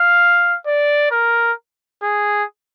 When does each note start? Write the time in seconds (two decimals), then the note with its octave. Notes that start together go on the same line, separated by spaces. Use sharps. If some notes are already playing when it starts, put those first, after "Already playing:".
Already playing: F5
0.66 D5
1.11 A#4
2.03 G#4